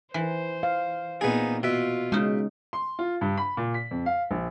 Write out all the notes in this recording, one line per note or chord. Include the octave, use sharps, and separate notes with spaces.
E3 C5
F5
A#2 B3 C4 D#4 G#4
B2 F4 E5
C#3 G#3 D#4
C6
F4
G2
B5
A#2
B6
F2
F5
A#1